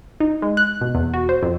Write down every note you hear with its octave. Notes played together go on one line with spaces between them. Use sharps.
D#4
G#3
F#6
B2
E2
F#4
C5
F2